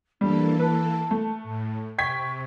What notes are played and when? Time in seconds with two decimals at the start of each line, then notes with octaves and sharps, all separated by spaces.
0.21 E3 G3 A#3 D4 A4
0.59 B4 A5
1.11 A3
1.43 A2
1.98 C3 G5 C#6 G#6 B6